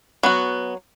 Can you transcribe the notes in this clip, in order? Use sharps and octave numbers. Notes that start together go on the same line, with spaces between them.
F#3 B3 F#4